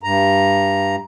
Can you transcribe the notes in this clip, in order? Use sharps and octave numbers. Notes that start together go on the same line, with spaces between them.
G2 A#5